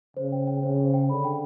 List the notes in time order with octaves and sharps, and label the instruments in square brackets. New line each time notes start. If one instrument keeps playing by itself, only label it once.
[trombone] C#3 [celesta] C5
[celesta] G5
G5
[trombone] C#3 [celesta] C5
[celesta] C5
G5
[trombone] D3 [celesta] B5
[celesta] G5